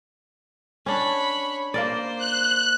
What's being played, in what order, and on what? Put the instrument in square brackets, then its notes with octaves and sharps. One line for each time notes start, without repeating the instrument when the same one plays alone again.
[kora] C#4 D4 [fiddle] C#5 B5
[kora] A#3 A#4 D5 [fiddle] C5
[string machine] F#6